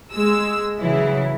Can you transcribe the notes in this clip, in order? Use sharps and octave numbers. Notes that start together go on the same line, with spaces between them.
G#3 E6
C#3 E3 F#3 E4